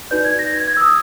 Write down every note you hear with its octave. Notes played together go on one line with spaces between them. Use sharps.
D#4 F#4 B4 D5 G6
G#6
A#6
G#6
G#6
E6
D#6